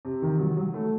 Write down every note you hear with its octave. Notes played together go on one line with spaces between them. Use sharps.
C3
D#3
F#3
F#3
A3